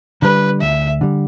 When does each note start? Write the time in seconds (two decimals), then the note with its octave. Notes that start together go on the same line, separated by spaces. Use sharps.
0.22 D3 G3 B4
0.62 D2 E5
1.01 D3 G3